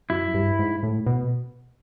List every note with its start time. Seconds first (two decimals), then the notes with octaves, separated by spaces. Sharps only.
0.10 F#2 E4
0.34 G2
0.59 G#2
0.83 A2
1.06 B2